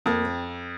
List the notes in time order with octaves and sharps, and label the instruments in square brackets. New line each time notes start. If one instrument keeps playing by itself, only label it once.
[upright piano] F2 [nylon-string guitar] A#3
[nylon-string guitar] C4